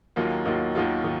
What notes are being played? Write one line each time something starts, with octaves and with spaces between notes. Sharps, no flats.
D#2 D#3 F#3 A#3 F4
D#2 D#3 F#3 A#3 F4
D#2 D#3 F#3 A#3 F4
D#3